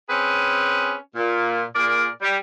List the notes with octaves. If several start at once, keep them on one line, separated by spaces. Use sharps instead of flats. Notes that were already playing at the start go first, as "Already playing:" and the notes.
C4 C#4 G#4 B4
A#2
A#2 G#4 A#4 D5
G3